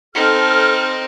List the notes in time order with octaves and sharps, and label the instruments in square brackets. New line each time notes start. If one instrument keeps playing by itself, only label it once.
[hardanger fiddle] C4 D#4 [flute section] A4 F6